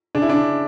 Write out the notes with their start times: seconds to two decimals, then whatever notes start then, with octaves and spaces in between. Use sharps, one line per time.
0.15 C#3 D4
0.22 E4
0.29 D4
0.35 C#3